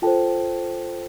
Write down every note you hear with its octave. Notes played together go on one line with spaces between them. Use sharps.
F4 A4 C5 G5 A5